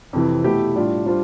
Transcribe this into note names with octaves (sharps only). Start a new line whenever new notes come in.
F2 C3 E3
B2 A3 E4 G4
A2 G3 D4 F4
G3 D4 F4 C5